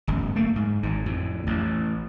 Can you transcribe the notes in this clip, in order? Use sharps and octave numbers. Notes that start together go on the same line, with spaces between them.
D1 G1 F#2
A3 A#3
G#2
G#1 G#2
F2 A2
A1